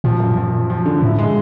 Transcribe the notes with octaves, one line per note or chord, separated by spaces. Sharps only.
A#2 F3
F#2
F3
F3
F3
D3
A2 E4
G#3